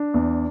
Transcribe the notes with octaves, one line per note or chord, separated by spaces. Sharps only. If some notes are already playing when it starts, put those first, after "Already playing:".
Already playing: D4
E2